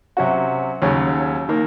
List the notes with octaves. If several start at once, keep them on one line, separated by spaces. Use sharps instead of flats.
C3 F#3 C#4 F#4
D#2 C#3 F#3 C#4
D#3 A#3